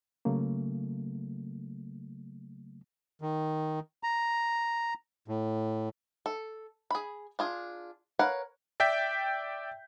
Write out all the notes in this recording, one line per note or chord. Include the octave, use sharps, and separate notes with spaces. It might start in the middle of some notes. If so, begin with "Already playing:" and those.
C#3 F#3 A3 A#3
D#3
A#5
A2
A4
G#4 B5
D4 F4 G#4
A#4 B4 C#5 F5 F#5
D5 E5 G5 G6 B6